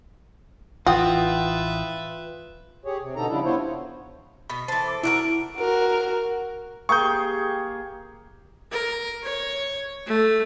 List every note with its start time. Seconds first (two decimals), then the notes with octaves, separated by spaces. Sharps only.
0.86 A1 E3 F4 F#4 B4 E5 G5 D#6
2.85 G4 G#4 C#5
3.02 C3
3.16 B2 D3 A3 D#4 A4 A#5
3.29 C#3 F3 G3 D4 E4
3.45 B3 E4 F4 C5 C#5
4.50 B2 B5
4.68 E3 A4 C5 A6
4.87 D6
5.03 D4 E4 F#4 A#4 D7
5.58 F#4 A#4
6.89 A#3 G4 G#4 C#6 G6
8.71 A#4
9.23 C#5
10.07 A3